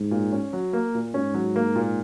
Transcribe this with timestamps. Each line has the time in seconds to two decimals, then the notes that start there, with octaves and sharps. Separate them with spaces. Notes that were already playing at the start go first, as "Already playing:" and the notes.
Already playing: G#2
0.11 A#2
0.32 C#4
0.53 F#3
0.73 A#3
0.94 A#2
1.14 G#2 C#4
1.34 F#3
1.56 A#3
1.76 A#2